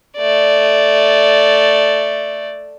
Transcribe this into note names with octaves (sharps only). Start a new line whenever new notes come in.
A3 D5